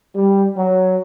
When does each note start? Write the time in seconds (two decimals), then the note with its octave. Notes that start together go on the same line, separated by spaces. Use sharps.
0.15 G3
0.56 F#3